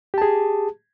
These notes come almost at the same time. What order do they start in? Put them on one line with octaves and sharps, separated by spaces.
G4 A5 G#4